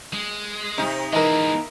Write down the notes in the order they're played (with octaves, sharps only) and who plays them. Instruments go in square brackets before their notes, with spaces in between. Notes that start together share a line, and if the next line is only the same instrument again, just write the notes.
[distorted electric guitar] G#3
[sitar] C3 D#4
[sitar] E3 [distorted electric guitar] G#3 A#3 [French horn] D#4 [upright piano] A#4 D#5